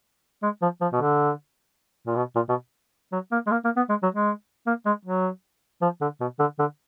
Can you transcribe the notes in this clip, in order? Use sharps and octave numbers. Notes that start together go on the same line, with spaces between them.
G#3
F3
F3
B2
D3
A#2
B2
A#2
B2
F#3
A#3
G#3
A#3
A#3
B3
G#3
F#3
G#3
A#3
G#3
F#3
F3
D3
B2
D3
D3